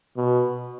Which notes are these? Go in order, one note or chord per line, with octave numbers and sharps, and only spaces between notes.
B2